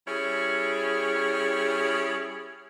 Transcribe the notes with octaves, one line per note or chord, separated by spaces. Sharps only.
G3 C#4 E4 G#4